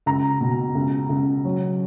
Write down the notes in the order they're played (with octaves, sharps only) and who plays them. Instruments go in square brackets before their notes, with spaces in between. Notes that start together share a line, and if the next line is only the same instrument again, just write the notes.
[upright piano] C#2 A#5
B2
C#2
C#2
F#3